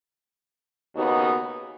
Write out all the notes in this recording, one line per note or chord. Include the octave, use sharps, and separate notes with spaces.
D#2 C#3 B3 D#4 F#4